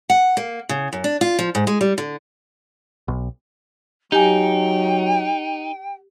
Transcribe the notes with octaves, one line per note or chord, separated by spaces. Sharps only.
F#5
A#3
C#3
F#2
D4
F4
F3
G#2
G#3
G3
D3
B1
F#3 D#4 G4 G5 G#5